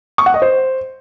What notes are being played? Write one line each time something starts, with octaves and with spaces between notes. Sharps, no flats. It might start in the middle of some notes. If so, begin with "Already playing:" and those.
C#6
F#5
D#5
C5